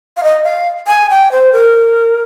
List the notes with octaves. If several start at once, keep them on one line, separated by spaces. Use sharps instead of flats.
F5
D#5
F5
G#5
G5
C5
A#4